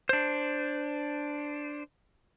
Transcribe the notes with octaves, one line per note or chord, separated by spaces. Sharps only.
D4 C5